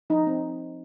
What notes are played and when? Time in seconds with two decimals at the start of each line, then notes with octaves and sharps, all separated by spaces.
0.10 F3 D#4
0.27 C4